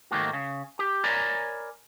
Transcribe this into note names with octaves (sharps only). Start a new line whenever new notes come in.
G#2 D#3 A3 A#3 F#4
C#3
G4
A#4 C#5 D5 G#5 A#5 B5